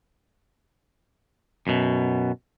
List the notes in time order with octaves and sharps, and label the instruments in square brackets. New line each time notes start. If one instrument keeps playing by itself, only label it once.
[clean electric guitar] F#2 B2